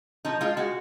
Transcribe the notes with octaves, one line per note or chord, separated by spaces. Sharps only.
F3 D#4
G#3 F4
G#3 F#4